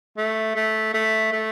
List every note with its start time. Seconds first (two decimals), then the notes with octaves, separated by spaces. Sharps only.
0.17 A3
0.56 A3
0.94 A3
1.33 A3